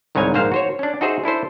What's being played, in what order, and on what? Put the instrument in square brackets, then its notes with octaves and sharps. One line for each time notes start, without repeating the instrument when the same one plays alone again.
[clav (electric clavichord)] G1 C2 G#2 C#5 G#5 A#5
A#1 G#2 A#3 C5 F5 A#5
F#4 C5 C#5
C#4 D4
D#4 F#4 G#4 C5 E5
D4 E4 A4 C5